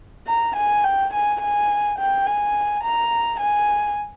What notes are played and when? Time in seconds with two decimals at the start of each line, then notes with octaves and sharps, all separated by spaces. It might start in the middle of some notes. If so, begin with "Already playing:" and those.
0.28 A#5
0.56 G#5
0.84 G5
1.13 G#5
1.41 G#5
1.99 G5
2.26 G#5
2.84 A#5
3.41 G#5